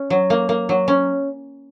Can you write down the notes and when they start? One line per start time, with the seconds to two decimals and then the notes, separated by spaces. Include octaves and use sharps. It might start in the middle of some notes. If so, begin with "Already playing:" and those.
Already playing: C#4
0.10 F#3
0.30 A#3
0.49 A#3
0.69 F#3
0.88 C#4